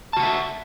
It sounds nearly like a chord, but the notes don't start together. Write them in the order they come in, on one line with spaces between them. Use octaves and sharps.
A5 F#4 F#5 E5